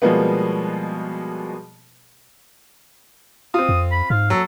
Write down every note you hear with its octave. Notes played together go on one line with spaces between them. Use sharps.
B2 F3 G3 G#3 A#3 B3
C4 F4 D#6
F2
B5
G#2 F5
F#3 A4